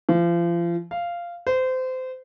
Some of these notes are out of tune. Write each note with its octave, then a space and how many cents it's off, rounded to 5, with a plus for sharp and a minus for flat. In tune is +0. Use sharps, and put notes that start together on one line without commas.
F3 -35
F5 -10
C5 -25